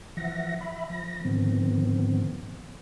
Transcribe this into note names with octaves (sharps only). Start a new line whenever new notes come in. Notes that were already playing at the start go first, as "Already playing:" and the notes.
E3 F3 E5 F#5 A#6
E5 B5
F3 A#6
G#2 D3 D#3 F3 B3 C4